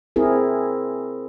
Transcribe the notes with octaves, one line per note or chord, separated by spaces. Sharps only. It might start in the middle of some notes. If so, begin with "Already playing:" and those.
C4 E4 G#4 A#4